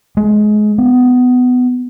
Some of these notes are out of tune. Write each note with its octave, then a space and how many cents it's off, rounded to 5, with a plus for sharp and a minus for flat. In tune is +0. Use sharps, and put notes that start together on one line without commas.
G#3 +25
B3 +20